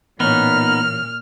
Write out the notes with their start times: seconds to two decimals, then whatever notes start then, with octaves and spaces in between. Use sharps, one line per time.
0.20 A1 A#2 B3 C#4 D#4 F6